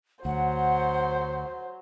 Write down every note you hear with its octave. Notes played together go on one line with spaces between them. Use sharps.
D2 F#3 C5 F#5